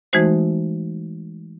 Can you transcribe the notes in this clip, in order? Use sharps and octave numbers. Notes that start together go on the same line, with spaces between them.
E3 G#3 A3 D#4 F#4 C5